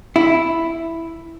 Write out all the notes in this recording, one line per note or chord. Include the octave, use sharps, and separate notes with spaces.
E4